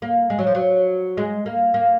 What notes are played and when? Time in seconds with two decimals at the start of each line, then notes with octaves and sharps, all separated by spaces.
0.02 A#3
0.30 G#3
0.39 F#3
0.47 F3
0.55 F#3
1.17 G#3
1.46 A#3
1.74 A#3